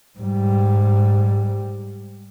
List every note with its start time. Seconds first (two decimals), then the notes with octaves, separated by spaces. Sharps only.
0.19 G#2 G3